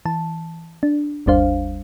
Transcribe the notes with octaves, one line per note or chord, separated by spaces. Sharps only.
E3 A5
D4
G1 D#2 G3 D4 C5 F5